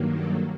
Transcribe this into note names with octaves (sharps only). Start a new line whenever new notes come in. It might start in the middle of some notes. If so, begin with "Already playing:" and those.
Already playing: G2 D#3 F#3 A#3
A4